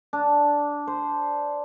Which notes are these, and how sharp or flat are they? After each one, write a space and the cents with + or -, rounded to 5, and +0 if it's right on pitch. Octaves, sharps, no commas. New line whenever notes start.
D4 -10
C5 -10